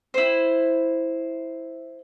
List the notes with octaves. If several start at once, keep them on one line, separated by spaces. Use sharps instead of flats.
E4 C5